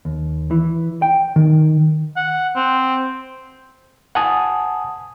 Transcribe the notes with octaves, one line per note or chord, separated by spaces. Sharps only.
D#2
E3
G5
D#3
F#5
C4
F#5 G#5 A5 D#6